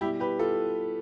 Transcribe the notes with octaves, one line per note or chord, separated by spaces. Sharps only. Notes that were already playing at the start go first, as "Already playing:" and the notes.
B2 G3 E4 G4
G4 B4
F4 A4